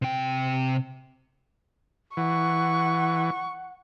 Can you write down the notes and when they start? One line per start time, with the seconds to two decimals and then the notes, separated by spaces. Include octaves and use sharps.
0.02 C3 G5
2.17 E3 F#5 C#6